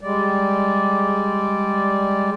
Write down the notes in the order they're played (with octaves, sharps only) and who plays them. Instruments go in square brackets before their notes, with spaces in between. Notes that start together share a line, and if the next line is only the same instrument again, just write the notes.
[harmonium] G3 G#3 D5